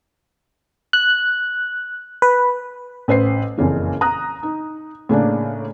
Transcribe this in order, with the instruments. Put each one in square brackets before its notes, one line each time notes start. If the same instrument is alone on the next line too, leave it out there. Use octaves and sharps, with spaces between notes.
[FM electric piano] F#6
B4
[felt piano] A1 B4 C5 C7
F#1 F2 A#2 C#3 E3
A#5 D#6 F#6
D#4
A2 C#3 A#3 D4